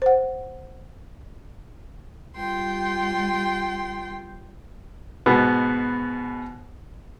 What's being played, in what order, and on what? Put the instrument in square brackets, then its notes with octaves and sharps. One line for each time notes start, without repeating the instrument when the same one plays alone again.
[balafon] C5 F#5
[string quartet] G3 F4 G5 C6
[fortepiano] G#2 B2 B3